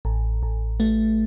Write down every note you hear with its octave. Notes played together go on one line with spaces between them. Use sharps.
A1
A1
A3